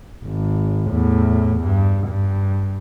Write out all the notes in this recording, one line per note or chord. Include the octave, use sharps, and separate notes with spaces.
G#1
E2 A2
G2
G2